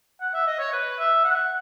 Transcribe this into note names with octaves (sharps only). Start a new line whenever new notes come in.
F#5
E5
D#5
C#5
B4
E5
F#5